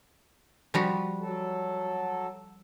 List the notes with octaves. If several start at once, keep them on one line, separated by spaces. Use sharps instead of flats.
F3 G3 F#4
F#3 A4